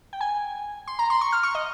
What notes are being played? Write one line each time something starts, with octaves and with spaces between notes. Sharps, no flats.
G5
G#5
C6
A#5
C6
C#6
F6
C#6
D#5